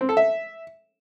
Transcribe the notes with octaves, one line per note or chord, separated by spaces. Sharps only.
C4
A4
E5